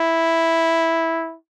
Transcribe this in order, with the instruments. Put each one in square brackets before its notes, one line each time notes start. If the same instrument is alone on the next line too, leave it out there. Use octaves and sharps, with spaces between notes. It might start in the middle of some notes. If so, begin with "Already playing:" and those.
Already playing: [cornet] E4